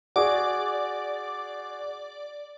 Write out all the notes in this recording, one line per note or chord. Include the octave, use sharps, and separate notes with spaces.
F#4 G#4 D5 D6